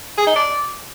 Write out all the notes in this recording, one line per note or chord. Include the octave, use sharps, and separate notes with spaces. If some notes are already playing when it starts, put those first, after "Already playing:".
G#4
D#4
D5